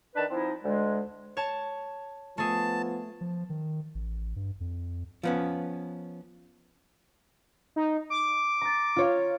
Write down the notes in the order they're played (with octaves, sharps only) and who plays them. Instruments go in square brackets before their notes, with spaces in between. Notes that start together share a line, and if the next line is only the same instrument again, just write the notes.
[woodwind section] D#3 D4 B4 A5
F3 C4 D#4 E4
D2 G#3
[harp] C#5 A5
[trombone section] F3 B3 [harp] A3 G#4 [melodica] A5
[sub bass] F3
D#3
A1
G2
F2
[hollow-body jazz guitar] F3 B3 C#4
[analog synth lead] D#4
D6
[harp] A#5 A6
F4 C#5 F5